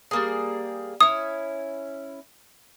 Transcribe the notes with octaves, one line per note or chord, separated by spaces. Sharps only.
G3 A#3 G#4
C#4 E4 D#6